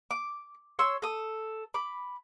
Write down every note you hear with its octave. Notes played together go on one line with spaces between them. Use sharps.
D6
C#5 C6 E6
A4 D#6
B5 D6